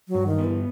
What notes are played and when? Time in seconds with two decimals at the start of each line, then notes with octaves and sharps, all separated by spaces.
0.08 F#3
0.15 G2
0.27 D#3
0.38 B3
0.44 E3